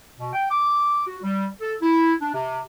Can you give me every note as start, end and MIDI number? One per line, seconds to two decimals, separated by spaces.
0.18 0.33 47
0.33 0.45 79
0.50 1.02 86
1.07 1.17 66
1.22 1.47 55
1.60 1.75 69
1.81 2.14 64
2.21 2.32 62
2.33 2.60 48